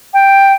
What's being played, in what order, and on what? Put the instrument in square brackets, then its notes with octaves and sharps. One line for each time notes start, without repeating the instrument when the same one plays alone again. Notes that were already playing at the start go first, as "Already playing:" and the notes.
[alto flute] G5